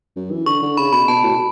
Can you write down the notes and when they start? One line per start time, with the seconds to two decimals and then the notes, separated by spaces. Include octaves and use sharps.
0.16 F#2
0.31 E3
0.46 D3 C#6
0.62 D3
0.77 C#3 B5
0.93 B2 B5
1.08 B2 A5
1.23 A2
1.30 B2